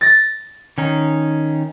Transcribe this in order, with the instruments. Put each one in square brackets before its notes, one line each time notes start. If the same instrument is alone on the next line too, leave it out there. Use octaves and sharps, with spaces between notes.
[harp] A6 A#6
[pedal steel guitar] D#3 C#4 D#4